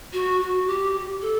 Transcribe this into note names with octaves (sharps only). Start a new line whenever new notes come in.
F#4
F#4
G4
A4